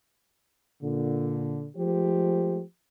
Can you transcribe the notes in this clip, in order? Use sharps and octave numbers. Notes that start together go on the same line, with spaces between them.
A#2 D3
F3 G#3 A3 G4 C5